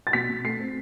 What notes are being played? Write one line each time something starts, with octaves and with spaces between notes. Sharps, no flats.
A6
B2 B6
B2
A3 C7
C4